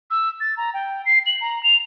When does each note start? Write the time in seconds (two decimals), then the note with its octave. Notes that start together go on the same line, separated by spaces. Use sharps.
0.11 E6
0.40 A6
0.57 A#5
0.74 G5
1.06 C7
1.26 F#7
1.41 A#5
1.63 F7